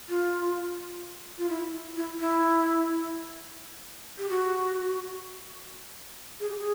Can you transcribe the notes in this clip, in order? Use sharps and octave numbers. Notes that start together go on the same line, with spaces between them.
F4
F4
E4
E4
E4
G4
F#4
G#4
G4
G#4